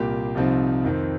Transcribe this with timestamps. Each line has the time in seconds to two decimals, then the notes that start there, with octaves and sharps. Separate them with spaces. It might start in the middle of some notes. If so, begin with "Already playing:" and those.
Already playing: C2 A#2 A#3 G4
0.35 C2 C3 F3 C4 D#4
0.84 F2 D#3 C4